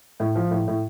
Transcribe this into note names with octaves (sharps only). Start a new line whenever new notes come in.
A2
F3
A2
A2